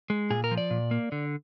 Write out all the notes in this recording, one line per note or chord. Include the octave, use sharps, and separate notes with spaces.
G#3
A#2 G#4
A#4
F3
D5
A#2
A#3
D3